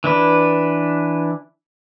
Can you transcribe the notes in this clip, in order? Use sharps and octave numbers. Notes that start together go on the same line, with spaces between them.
E3 D4 B4